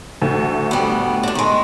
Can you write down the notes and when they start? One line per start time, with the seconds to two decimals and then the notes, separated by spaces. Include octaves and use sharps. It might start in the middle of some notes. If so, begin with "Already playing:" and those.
0.22 D2 A2
0.71 G3 B3
1.23 D3 D4
1.35 D#3 G#3